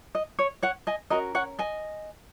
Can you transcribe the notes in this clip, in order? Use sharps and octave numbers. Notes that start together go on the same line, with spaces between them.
D#5
C#5
C#5 F#5
D#5 G#5
C#4 F#4 A#4 D#5
C#5 F#5
D#5 G#5